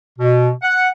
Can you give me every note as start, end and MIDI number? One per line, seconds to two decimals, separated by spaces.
0.19 0.50 47
0.62 0.89 78